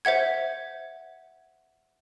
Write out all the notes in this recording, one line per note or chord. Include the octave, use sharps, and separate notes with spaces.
C5 E5 F#5 G#6